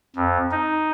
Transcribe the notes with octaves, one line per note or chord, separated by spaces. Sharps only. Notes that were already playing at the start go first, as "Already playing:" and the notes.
F2
D#4